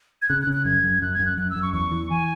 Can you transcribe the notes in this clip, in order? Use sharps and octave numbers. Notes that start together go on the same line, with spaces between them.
G#6
C#3 F#6
F#6
C#3
F#6
F#2 G#6
F#2
F#2 F#6
G#6
F#2
F#6
F#2 F#6
E6
F#2
C#6
E2 C#6
E3
E3 G#5